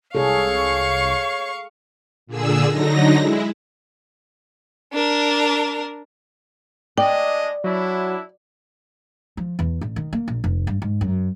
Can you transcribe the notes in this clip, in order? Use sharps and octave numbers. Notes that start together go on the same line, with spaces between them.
C2 G#4 A4 C#5 F5 C#6
A#2 D3 G#4 E6
D3 F#3 D#4 A#6
G#3 E4
D4 A#4
G#3 D4 D5 D#5 G5
F#3 D4 E4
F3
E2
A1
D#3
A#3
A#1
F1
G2
G#2
F#2